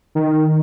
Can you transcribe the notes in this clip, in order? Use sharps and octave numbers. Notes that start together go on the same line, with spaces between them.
D#3